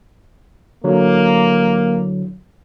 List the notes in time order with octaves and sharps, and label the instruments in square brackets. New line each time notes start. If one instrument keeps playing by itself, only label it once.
[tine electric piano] D3 F#3 [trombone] A#3